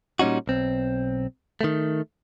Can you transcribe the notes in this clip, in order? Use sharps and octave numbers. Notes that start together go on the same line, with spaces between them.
A#2 G3 C#4 D#4 F#4
B1 C4
D#3 A3